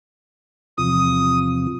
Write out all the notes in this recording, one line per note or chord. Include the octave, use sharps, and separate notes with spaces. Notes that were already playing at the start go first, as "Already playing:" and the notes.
E2 C3 F3 D#6